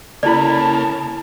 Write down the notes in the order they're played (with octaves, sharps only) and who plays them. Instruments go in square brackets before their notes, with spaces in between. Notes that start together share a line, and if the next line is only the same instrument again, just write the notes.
[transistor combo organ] C#3 A#3 [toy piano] E4 D5 [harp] A4 G#5 B5 [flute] A5